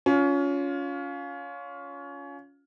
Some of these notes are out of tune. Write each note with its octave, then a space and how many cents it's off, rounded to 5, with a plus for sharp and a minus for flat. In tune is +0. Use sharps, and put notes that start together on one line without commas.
C#4 +25 F4 +15